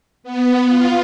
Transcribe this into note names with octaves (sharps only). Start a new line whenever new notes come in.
B3
F4